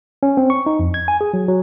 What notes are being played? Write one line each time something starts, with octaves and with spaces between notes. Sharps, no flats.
C#4
C4
C#6
D#4
F2
G#6
G#5
G#4
F#3
F#3